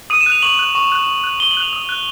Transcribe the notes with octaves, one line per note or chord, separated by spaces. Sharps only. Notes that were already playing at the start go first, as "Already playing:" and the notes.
D#6 D#7
E7
F#6
F7
C#6 F#7
F#6
C#6
F#6
C#6
F#6
C#6 G7
F#7
F#6 F7
D#6
F#6